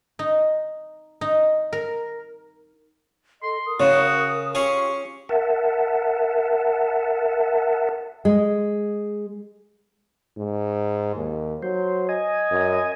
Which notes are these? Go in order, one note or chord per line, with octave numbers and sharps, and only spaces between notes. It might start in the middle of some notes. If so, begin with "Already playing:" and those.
D#4
D#4
A#4
A4 D#5 C6
A#4 D#6
C#3 F#4 C#5
C#4 F4 G4 G#4 F5 C#6
A#4 E5 F#5 A5
G#3
G#2
D#2
F#3 C5
D#5 G#5
F#2